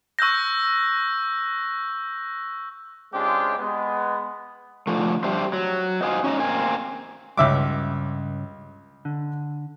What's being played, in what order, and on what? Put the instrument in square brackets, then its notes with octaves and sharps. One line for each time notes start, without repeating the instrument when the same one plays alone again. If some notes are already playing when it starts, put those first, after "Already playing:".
[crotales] C#6 E6 F#6 G6 A#6
[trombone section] C#3 G#3 C4 D4 F4 G4
G#3 B3
[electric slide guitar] D3 F3 A3
G3 D4 G4 C5 E5
F#3
C5 D#5 F5 G#5
C#4 D#4 D#5
A#3 C4 G#5
[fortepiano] C#2 E5 D6 [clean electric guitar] G2 C#3
[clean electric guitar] D3